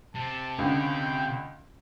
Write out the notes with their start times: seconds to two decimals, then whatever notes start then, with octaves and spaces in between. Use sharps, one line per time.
0.15 C3 A5
0.59 C#2 D3 G5